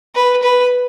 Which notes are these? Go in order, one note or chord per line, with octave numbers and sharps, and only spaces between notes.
B4
B4